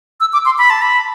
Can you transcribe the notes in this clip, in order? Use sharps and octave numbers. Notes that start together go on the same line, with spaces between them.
E6
D6
C6
B5
A5
B5